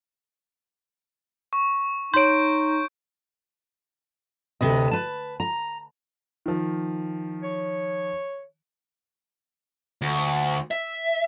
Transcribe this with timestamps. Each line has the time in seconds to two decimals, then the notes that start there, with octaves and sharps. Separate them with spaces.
1.53 C#6
2.14 D#4 C#5 C6 G6 D7
4.61 D2 C3 B4 D#5
4.91 B4 A5
5.40 A#5
6.46 D#3 F3
7.43 C#5
10.02 D2
10.71 E5